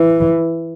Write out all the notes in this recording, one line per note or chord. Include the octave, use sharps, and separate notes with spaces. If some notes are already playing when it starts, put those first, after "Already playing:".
Already playing: E3